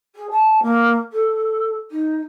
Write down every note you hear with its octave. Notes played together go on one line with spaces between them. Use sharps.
G#4
A5
A#3
A4
D#4